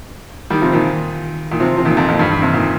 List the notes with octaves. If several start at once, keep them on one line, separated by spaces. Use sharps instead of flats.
D#3 G3
C3 F3
A#2 D#3
A#2 D#3
C3 F3
C3 F3
A#2 D#3
F2
F2 A#2
G2
G2
G2 C3
A#2 D#3